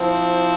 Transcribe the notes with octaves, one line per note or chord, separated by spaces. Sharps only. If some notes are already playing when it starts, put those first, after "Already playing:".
Already playing: F3 C4 E4